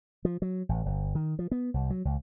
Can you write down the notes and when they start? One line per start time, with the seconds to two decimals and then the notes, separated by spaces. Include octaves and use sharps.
0.25 F3
0.42 F#3
0.69 A1
0.86 G1
1.15 D#3
1.39 F3
1.51 B3
1.74 C2
1.90 F#3
2.05 C#2